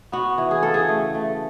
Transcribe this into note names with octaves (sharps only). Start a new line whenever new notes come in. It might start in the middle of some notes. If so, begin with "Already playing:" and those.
B3 F#4
E3
G#4
C#3 A4
G#4
A3
A3